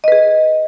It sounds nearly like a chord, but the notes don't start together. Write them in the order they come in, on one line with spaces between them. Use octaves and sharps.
D#5 B4 G#4